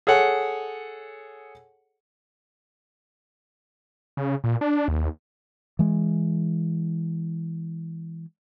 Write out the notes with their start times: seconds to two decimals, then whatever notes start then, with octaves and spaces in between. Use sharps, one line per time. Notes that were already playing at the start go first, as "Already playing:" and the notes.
0.07 G#4 A4 C#5 F#5
4.17 C#3
4.44 A#2
4.61 D4
4.88 D#2
5.79 E3 G#3